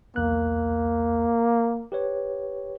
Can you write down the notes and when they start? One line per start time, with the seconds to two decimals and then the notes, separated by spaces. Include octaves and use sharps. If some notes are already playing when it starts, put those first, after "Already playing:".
0.16 B1 E2 A#3 F#6
1.92 G4 B4 C#5